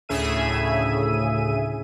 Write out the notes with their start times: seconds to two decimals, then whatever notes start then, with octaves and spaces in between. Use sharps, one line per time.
0.09 D2 A2 C#3 G#4 E5 D#7